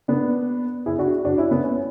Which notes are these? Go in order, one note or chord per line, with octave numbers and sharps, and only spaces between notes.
B3 D4
E4 G#4
D4 F#4
D4 F#4
C#4 E4
B3 D4
C#4